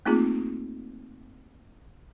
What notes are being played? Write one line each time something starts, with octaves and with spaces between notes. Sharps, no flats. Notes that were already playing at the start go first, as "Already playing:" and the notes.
A3 A#3 C4 D#4 F4 G#4